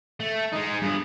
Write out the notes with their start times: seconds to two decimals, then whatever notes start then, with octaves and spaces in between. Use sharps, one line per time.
0.20 A3
0.53 G#3 D#4
0.82 G2 B3